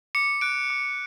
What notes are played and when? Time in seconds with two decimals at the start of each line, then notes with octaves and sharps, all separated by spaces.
0.15 D6 C#7
0.41 F#6 D7
0.70 D6